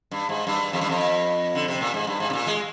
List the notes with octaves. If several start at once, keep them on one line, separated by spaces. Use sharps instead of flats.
G2
G#2
G2
F2
G2
F2
D3
C3
A#2
G#2
G2
G#2
C3
A#2
G#3